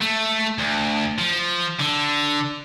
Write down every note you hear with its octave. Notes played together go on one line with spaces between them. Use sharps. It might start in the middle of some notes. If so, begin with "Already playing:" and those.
A3
D2
F3
D3